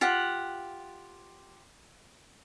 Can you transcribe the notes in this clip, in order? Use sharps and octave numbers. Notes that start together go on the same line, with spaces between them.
F4 G4 F#5